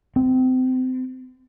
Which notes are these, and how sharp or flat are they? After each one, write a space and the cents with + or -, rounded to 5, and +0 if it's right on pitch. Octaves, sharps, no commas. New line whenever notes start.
C4 -30